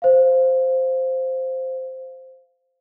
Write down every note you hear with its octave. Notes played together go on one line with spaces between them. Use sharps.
C5 F5